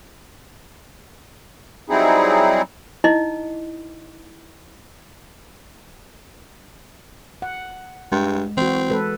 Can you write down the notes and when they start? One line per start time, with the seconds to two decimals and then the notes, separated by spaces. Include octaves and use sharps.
1.89 F#3 G3 C4 D#4 E4 G#4
3.04 D#4 E4 D#5
7.42 F#5
8.12 G2 G#3
8.57 E3 C4 F#4
8.90 G#3 A4 B4